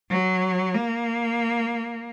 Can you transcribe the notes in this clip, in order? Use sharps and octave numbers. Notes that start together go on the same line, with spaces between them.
F#3
A#3